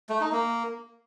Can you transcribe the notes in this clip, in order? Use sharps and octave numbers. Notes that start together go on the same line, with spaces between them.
A3
D#4
A#3